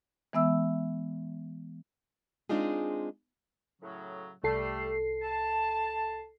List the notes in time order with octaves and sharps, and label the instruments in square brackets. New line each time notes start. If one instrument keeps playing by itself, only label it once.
[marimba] E3 G#3 B3 E5 E6
[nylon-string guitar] G#3 C4 D4 D#4 F4 G#4
[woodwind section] A2 C#3 F#3
[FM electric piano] C2 A4 C7 [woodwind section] G3 A3
[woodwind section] A5